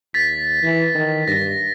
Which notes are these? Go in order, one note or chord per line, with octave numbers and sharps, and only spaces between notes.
D#2 A6 B6
E3
D#3
G2 A#6